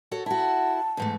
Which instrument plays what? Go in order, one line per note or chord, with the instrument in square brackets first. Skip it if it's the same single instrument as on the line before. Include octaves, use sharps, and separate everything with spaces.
[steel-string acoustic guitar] F#4 A4 C#5
[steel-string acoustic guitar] E4 F#4 [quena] A5
[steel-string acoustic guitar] E2 G#2 A3